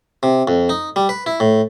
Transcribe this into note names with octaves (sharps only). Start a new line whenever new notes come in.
C3
F2
D#4
G3
B4
E4
A2